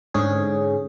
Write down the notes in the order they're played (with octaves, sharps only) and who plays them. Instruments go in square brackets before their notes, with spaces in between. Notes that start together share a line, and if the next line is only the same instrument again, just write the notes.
[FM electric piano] G#2 D3 C#4 G#4